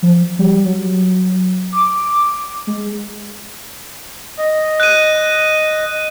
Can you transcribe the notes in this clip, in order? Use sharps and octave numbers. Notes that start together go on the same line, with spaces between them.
F3
G3
F#3
D6
G#3
D#5
F#6 D#7